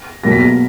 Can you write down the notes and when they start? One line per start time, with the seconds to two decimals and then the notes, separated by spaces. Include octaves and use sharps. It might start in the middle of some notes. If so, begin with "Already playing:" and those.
Already playing: A#6
0.24 B2 F#3 A#3 A#6
0.31 B6
0.39 A#6